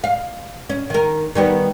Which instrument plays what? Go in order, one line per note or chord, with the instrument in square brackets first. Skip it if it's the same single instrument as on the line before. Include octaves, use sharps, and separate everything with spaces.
[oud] F5
C#4
D#3 A#4
D#3 G3 B3